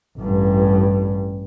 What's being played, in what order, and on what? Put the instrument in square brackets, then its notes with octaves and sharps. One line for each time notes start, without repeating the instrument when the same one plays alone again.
[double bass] A1 G2